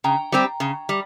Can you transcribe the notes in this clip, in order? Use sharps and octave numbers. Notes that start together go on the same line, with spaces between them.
C#3 G5 A#5
G3 C4 G4
C#3
G3